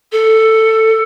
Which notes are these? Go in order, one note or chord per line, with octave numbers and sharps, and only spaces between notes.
A4